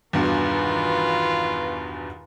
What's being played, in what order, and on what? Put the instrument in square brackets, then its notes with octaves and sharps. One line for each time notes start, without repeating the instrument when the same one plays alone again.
[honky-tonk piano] E2 G2 B2 [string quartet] D#3 F4 B4